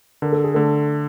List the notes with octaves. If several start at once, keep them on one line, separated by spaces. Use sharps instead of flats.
D3 A#4
A4
G#4
D3 A3 A4